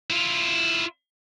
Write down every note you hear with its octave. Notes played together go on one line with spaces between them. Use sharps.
E4 F4